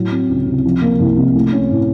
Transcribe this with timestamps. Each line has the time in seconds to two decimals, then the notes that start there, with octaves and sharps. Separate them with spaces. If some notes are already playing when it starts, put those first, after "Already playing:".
Already playing: A2 F#3
0.12 C4
0.30 C#2
0.46 C3
0.65 F3
0.82 A#3
1.00 C2
1.17 C3
1.35 A3
1.52 C#4
1.70 A2